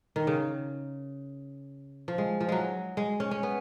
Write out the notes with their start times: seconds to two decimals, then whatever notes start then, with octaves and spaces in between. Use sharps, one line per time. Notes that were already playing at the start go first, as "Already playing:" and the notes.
0.16 D#3
0.27 C#3
2.08 F3
2.18 G#3
2.41 F3
2.49 F#3 G#3
2.97 G#3
3.20 C#4
3.31 C#4
3.43 B3